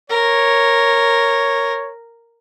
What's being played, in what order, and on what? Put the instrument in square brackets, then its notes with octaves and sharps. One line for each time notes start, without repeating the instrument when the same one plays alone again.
[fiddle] A#4 [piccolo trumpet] C#5